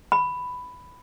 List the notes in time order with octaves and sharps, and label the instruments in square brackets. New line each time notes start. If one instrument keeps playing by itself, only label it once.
[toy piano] B5